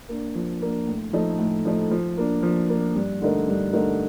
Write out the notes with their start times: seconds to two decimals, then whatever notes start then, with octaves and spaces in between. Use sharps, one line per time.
0.09 A#3 D4
0.35 F3
0.62 A#3 D4
0.88 A2
1.13 F3 A3 D#4 A4
1.39 A2
1.65 F3 A3 D#4 A4
1.91 F3
2.17 A#3 D4
2.43 F3
2.70 A#3 D4
2.95 G2
3.21 D3 A3 D#4 A#4
3.47 G2
3.73 D3 A3 D#4 A#4